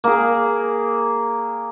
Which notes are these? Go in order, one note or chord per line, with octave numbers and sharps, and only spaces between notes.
A#3 G#4